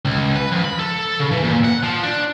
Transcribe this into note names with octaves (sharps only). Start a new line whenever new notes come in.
C#2
B4
F2
B5
A4
C#3
E3
A#2
F#5
F3
D4